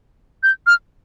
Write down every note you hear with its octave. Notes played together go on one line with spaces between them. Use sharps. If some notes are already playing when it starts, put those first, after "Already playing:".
G6
F6